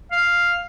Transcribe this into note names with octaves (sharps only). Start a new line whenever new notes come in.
F5